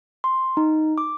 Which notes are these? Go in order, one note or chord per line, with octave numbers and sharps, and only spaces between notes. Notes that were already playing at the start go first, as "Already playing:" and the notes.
C6
D#4
D6